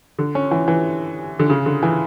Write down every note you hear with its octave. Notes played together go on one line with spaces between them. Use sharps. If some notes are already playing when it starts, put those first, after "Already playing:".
D3
C#4
E3
E3
D3
C#3
D3
E3